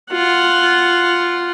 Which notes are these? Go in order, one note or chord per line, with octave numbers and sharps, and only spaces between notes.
F4 F#5